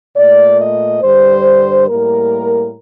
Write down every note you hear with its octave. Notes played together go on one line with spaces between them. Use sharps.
A#2 A3 D5
D#5
G2 D3 G3 C5
A2 G3 A#3 A#4